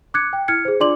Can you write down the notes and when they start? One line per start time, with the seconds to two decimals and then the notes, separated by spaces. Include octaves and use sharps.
0.14 D6 F#6 G#6 C#7
0.33 G5
0.48 E4 F6 G#6 C#7
0.65 G#4 C5
0.80 D4 F4 D5 C6 D6 F#7